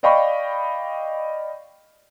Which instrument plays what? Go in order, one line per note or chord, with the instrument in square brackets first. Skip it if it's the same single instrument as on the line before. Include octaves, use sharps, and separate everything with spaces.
[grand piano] D5 D#5 F5 G5 B5 C#6